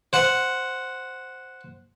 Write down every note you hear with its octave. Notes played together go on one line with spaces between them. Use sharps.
C5 F#5